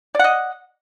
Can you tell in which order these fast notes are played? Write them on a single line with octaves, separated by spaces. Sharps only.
D5 F#5 D#5